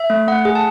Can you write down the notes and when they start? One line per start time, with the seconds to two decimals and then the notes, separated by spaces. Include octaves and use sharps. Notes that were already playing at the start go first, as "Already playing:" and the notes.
Already playing: E5
0.10 A3
0.28 A3 F#5
0.45 G#4
0.55 A5